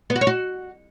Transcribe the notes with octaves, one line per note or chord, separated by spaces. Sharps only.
B3
F#4
C#5
F#4